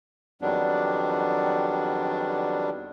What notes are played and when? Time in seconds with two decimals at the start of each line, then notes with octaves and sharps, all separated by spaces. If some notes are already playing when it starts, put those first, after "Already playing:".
0.42 F2 D#3 F#3 G3 B3 D4